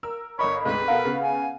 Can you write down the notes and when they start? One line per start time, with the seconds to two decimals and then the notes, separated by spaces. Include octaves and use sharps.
0.03 A#4 E6
0.39 G1 A#4 C#5 D#5 B5
0.65 D2 G#2 C3 B4
0.88 B2 A4 A#4 F5 F#5
1.05 C#3 B3
1.22 G#5